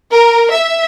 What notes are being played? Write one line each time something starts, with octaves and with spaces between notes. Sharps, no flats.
A#4
E5